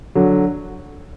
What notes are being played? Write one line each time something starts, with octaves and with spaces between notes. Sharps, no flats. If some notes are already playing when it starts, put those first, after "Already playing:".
D3 F#3